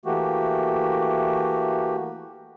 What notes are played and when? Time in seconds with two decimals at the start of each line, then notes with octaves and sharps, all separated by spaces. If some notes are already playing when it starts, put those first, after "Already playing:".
0.05 E3 A3 A#3 F#4 G4